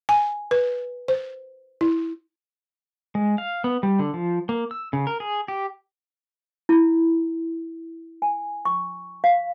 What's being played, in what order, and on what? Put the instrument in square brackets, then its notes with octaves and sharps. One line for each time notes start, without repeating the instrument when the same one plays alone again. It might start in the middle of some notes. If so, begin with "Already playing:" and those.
[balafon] G#5
B4
C5
E4
[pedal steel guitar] G#3
F5
B3
G3
D3
F3
A#3
E6
C#3
A#4
G#4
G4
[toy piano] E4
G#5
C#6
F5